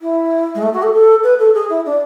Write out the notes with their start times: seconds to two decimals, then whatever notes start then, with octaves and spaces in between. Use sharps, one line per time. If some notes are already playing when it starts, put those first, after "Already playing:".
0.01 E4
0.55 G#3
0.62 A3
0.73 F#4
0.82 A4
0.93 A4
1.23 B4
1.39 A4
1.54 G#4
1.69 E4
1.85 D4